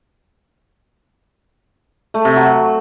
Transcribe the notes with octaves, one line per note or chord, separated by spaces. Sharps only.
A3
C3
F#3